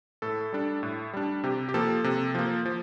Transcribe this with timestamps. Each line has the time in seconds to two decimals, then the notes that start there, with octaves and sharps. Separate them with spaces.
0.22 A2 A4
0.53 G3 D4
0.83 A2
1.13 G3 D4
1.44 C3 G4
1.69 G4
1.74 F3 A#3 A4
2.04 C3
2.35 F3 A#3
2.66 F3